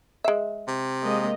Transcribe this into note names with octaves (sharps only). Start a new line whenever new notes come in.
G#3 E5
C3
G#3 A#3 D#5